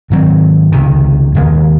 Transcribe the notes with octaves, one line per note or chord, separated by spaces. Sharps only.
G#2 D#3 F#3 C4
C#2 C3 D#3
D#2 D#3 G#3